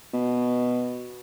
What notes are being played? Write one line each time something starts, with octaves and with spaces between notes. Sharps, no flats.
B2